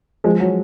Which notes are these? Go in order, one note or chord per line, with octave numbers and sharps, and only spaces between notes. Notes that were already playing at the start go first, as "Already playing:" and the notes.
F3 G#3
F#3